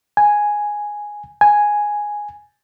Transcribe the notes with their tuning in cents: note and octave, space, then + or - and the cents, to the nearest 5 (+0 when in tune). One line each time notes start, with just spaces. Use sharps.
G#5 +0
G#5 +0